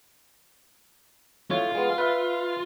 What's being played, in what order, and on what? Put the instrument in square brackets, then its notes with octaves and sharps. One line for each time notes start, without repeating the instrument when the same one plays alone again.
[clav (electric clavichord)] A2 C#5 [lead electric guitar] F4
[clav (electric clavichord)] G#3 B3
B4 E5